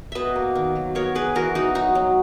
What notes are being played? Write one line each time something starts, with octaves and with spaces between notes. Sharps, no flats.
B2 B4 D#5 E5
A#3
D#3
F#3
B3 A#4 C#5
B3 G#4 B4
E3 F#4 A#4
B3 D#4 F#4
F#3 D#4 F#4
F#3